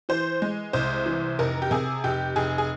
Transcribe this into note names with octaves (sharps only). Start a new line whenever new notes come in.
E3 C5
G#3
C2 C5
E3
F1 A#4
G4
C3 G#4
F1 G4
F1 G#4
G#4